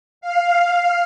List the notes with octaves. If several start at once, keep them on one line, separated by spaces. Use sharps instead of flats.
F5